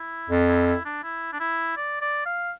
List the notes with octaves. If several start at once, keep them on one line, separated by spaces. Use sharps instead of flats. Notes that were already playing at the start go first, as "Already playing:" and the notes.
Already playing: E4
F2
E4
E4
D4
E4
D4
E4
D5
D5
F5